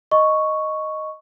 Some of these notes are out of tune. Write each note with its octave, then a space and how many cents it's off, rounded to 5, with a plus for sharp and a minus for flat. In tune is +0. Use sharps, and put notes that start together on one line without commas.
D#5 +0 C#6 +0